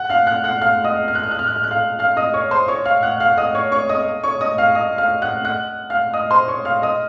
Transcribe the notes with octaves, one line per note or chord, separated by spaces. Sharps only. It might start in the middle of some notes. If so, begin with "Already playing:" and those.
Already playing: F#5 F#6
F5 F6
F#5 F#6
F#5 F#6
F5 F6
D#5 D#6
F6
F#6
F6
F#6
F6
F#6
F6
F#6
F5 F6
F5 F6
D#5 D#6
C#5 C#6
C5 C6
C#5 C#6
F5 F6
F#5 F#6
F5 F6
D#5 D#6
C#5 C#6
C#5 C#6
D#5 D#6
C#5 C#6
D#5 D#6
F5 F6
D#5 D#6
F5 F6
F#5 F#6
F#5 F#6
F5 F6
D#5 D#6
C5 C6
C#5 C#6
F5 F6
D#5 D#6